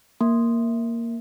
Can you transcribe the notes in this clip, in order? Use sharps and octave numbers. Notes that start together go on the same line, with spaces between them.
A#3